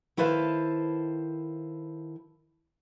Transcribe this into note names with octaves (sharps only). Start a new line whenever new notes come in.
D#3 E4 A4 B4 C5 F5